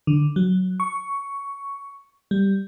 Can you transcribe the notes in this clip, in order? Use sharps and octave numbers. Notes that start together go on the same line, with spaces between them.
D3
F#3
C#6
G3